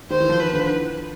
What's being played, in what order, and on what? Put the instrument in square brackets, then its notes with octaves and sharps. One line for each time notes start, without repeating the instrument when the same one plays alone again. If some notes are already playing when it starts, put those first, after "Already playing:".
[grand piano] D#3 [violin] C5
[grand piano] E3
F3
[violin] B4
[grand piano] D3